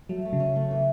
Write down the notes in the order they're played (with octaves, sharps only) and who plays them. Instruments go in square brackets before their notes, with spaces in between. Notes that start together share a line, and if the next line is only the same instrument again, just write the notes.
[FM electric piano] F#3 [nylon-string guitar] A3
[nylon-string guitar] A3
[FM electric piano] C#3 F#3
[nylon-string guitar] C#4
A3
E3